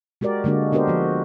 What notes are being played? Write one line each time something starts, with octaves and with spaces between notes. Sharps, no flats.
G#3 F#4 G4 A#4 D5
D3 G#3 A#3 D4 F#4
B3 D4 F#4 G4 A#4 C5
F3 F#4